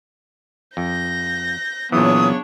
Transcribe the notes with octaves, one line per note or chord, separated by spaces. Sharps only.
F2 G6 A#6
A#2 C#3 E3 F#3 B3 D4 C#5 D#6